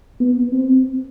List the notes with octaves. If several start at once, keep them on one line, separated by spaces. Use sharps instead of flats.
B3
C4